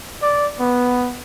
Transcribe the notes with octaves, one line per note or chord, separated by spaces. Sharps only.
D5
B3